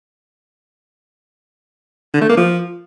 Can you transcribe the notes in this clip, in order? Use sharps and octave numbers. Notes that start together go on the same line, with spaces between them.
D3
A3
A#3
F3